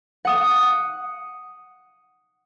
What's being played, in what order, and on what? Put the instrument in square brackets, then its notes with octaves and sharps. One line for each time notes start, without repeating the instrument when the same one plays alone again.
[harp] F#5 D#6